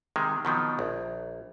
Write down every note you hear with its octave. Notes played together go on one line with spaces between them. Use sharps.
C3 D#3 G#3
B2 D#3 F3 F#3
A#1